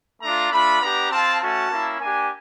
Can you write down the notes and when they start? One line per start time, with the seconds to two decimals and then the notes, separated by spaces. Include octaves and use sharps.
0.22 A3 D4 F4 A#5
0.52 A3 D4 F4 B5
0.82 B3 D4 G4 A#5
1.11 C4 F4 A5
1.41 A3 C#4 F#4 A5
1.70 A#3 C#4 E4
2.00 A#3 D4 G4 G#5